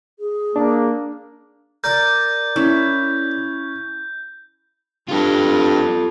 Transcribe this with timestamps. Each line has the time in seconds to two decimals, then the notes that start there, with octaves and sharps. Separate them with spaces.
0.19 G#4
0.56 A#3 D4
1.84 A#4 D5 G6
2.56 C#4 E4
5.09 G2 F4 A4